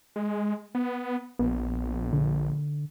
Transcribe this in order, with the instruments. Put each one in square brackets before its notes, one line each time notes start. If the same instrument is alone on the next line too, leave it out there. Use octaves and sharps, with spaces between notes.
[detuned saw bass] G#3
B3
[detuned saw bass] A#1 [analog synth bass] B3
[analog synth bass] D3